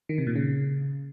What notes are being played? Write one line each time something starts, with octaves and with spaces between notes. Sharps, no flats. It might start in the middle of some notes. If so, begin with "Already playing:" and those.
D#3
C3
A#2
C#3